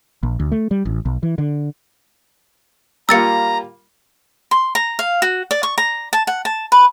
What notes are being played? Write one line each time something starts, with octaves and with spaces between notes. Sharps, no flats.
A#1
D2
A3
G3
A1
B1
E3
D3
G3 A#3 F4 A#5 E6 A6 C#7
C6
A#5
F5
F#4
D5
C#6
A#5
A5
F#5
A5
B4